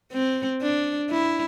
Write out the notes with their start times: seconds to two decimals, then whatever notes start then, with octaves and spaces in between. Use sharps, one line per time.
0.12 C4
0.62 D4
1.11 E4